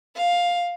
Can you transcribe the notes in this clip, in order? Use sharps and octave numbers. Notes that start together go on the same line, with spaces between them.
F5